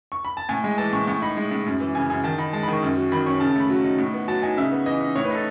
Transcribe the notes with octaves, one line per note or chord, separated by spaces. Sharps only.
C#6
B5
A5
A2 G#5
G#3
E3 A5
A2 C#6
A2 C#6
D#4 B5
G#3
A2
F#2
E3
C#3 G#5
F#2 G#5
D#3 A5
D#4 B5
G#3 A5
B5
D#3
C#6
F#2
F#3
D#3 B5
C#4 C#6
C#3 A5
A5
A3 B5
F#3
D#4
A2
B3
F#3 A5
D#4 G#5
C#3 E5
B3
E3 D#5
D#4
A2 C#5
B4
D#4 A4